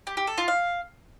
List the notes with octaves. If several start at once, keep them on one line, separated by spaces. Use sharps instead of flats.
G4
G4
A4
F4
F5